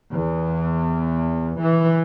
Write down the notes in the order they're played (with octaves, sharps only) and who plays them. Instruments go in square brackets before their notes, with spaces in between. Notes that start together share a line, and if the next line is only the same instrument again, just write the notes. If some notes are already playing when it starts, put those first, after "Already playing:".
[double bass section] E2
E3